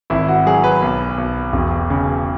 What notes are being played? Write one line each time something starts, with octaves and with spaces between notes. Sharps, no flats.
G#1 E4
F#4
F#3 G#4
B4
B1
B1
E1
C#3